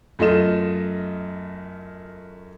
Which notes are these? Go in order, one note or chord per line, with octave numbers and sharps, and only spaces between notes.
F#2 A3 F4 D#5 E7